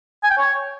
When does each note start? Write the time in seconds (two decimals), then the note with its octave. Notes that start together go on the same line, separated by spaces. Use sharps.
0.23 G#5
0.30 G5
0.37 C#5